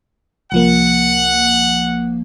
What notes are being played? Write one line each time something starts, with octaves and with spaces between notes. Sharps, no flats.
C2 F3 A#3 F#5